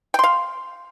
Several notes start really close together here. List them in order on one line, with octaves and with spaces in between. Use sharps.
G5 C6 F5